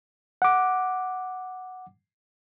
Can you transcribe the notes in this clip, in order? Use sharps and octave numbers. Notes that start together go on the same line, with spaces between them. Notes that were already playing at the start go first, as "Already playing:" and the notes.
F#5 D6